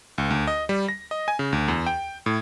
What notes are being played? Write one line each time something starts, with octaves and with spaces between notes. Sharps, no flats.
C#2
D2
D#5
G3
A#6
D#5
G#5
C#3
D2
E2
G5
A2